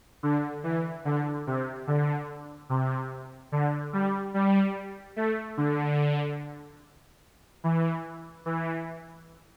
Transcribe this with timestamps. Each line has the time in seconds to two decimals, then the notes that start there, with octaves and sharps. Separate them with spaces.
0.23 D3
0.64 E3
1.05 D3
1.47 C3
1.87 D3
2.70 C3
3.52 D3
3.93 G3
4.34 G3
5.16 A3
5.57 D3
7.64 E3
8.46 E3